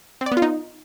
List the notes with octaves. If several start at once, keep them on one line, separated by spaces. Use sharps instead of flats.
C4
D5
B3
F4
D#4